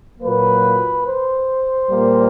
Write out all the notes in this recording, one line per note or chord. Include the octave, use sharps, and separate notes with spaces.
A#2 F#3 A#3 B4
C5
A#2 G3 A#3